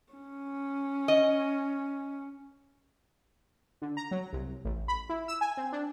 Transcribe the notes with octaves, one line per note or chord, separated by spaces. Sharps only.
C#4
D#5
D3
A#5
F#3
C2
A1
B5
E4
E6
G#5
C4
D4